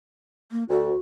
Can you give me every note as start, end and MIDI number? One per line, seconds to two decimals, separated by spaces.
0.52 0.64 58
0.70 0.90 38
0.70 0.99 66